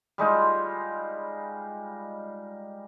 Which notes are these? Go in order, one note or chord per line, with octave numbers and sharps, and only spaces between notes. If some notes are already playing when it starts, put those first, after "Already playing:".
G3 G#3 D#4 F4